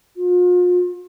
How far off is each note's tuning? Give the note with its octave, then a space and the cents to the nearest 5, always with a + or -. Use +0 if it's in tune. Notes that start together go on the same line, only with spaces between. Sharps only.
F4 +40